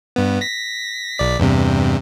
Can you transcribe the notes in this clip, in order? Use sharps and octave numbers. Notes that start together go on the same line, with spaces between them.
G2 B3
A#6 B6
B1 D5 B6
E2 G2 C3